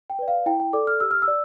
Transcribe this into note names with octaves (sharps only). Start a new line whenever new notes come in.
G5
B4 D5
F5
E4 G5
G5
A4 D5 D6
F6
G4 E6
F6
E6
D5